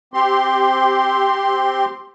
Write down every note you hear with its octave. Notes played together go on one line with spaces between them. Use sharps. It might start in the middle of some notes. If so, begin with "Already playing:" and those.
C4 G4 C6